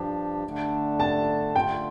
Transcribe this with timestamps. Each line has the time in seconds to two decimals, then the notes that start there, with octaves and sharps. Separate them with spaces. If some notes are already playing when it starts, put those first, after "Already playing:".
Already playing: G2 F3 D4 G4
0.44 D3 A3 D4
1.00 A5
1.55 D3 A3 F4 G5